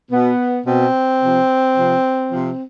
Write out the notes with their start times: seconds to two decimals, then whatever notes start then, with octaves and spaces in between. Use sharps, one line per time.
0.11 B2 B3
0.66 B2 C4
1.21 C3 F3
1.76 C3 F3
2.31 C3 F3